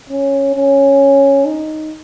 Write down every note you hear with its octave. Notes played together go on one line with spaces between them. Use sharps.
C#4
C#4
D#4